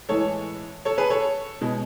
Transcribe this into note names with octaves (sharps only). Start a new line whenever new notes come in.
A2 E3 G#3 A4 C#5
A4 C#5
G#4 B4
A4 C#5
B2 G#3